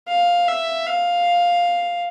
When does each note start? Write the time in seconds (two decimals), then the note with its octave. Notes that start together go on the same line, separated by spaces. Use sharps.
0.08 F5
0.48 E5
0.87 F5